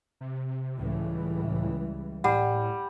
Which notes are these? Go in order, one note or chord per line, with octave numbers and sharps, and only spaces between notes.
C3
C#2 A2 E3 G3
A2 G3 F#5